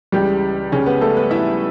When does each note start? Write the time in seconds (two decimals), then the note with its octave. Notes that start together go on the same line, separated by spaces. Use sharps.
0.12 C#2 C#3 E3 G3 G4
0.72 C#3 C#4
0.86 B3
1.01 A3 A4
1.17 B3 B4
1.31 E4 E5